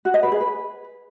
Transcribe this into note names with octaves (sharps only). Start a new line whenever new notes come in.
F#4
D#5
B4
G#4
B4